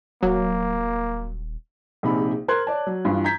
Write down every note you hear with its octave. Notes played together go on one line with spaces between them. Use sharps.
D#1 F#3 A#3
A#1 C3 D#4 G#4 B5
A#4 C5 C6 F#6 G#6
C#5 D5 A5
F#3
G2 E3 F4
A#5 G6 G#6 B6